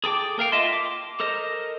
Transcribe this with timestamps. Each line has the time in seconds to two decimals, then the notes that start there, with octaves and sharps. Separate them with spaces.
0.04 G#4 A4 G5 D6
0.38 A#3 A#4 F5 G5
0.52 F4 D#5 E5 A5 C6
0.73 D6
1.20 A4 A#4 C5 D#5